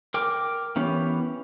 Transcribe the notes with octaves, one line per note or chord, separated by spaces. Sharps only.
A#4 G5 D6
E3 B3 C#4 G4